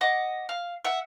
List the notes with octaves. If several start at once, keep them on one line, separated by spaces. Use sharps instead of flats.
D#5 F#5 D6
F5
E5 F#5